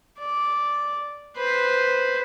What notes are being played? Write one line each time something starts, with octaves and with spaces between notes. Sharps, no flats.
D5
B4 C5